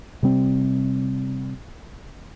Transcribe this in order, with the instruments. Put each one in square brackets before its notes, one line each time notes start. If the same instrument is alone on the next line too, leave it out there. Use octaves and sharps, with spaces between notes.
[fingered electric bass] C3 G3 C4